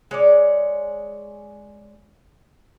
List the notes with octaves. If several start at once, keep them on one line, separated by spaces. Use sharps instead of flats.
G#3 C#5 D5